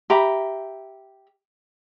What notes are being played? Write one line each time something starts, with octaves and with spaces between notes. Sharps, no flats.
G4 E5 A#5 B5